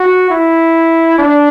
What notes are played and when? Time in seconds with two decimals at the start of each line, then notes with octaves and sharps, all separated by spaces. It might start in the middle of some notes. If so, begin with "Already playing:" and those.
Already playing: F#4
0.30 E4
1.18 D4